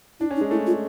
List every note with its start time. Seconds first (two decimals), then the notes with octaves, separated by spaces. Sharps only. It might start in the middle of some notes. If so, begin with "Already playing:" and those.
0.20 D4 E4
0.31 C#4
0.36 D#4
0.41 G#3
0.51 A3 E4
0.67 F4